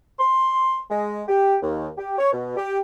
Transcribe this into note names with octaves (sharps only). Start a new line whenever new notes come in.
C6
G#3
G4
D#2
G4
C#5
B2
G4